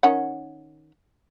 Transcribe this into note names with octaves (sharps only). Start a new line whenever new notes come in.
D#3 C#4 F#5